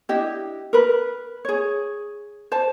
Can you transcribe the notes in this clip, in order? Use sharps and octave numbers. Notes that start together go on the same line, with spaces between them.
D4 E4 G4 D#5
A#4 B4
G#4 C#5
C5 A5